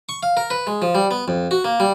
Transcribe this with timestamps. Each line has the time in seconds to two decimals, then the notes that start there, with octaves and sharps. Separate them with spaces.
0.09 C#6
0.23 F5
0.37 A#4
0.50 B4
0.67 G#3
0.82 F3
0.95 G3
1.11 B3
1.28 F2
1.51 F#4
1.65 A#3
1.80 G3